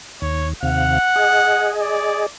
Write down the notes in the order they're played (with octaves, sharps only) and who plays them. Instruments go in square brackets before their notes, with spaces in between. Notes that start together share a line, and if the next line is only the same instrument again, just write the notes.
[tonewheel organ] D#2 [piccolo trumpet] C#5
[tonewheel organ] D#2 C3 F5 [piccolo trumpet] F#5
[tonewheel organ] G#4 D#5
[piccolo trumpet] D5